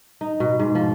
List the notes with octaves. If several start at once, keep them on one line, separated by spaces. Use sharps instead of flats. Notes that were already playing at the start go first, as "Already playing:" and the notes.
D#4
B2
G#2
F3